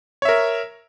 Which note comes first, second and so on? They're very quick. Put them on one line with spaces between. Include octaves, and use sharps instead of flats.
C#5 E5 A#4